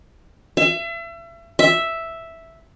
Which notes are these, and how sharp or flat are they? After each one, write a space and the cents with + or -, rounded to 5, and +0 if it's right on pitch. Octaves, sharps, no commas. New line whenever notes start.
E5 +35
E5 +0